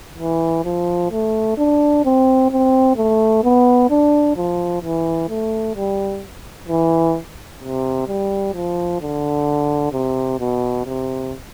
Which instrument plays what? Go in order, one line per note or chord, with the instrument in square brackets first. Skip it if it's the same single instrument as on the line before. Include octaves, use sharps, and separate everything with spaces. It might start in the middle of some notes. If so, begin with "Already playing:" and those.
[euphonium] E3
F3
A3
D4
C4
C4
A3
B3
D4
F3
E3
A3
G3
E3
C3
G3
F3
D3
C3
B2
C3